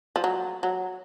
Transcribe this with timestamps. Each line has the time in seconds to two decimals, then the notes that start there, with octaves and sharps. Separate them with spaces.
0.16 F3
0.24 F#3
0.63 F#3